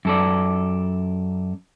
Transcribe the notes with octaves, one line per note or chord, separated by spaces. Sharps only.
F#2 A4 D5